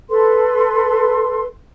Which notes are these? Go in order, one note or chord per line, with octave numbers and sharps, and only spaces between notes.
A4 B4 C6